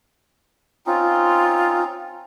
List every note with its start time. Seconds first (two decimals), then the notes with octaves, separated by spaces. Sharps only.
0.86 C4 C#4 D#4 F4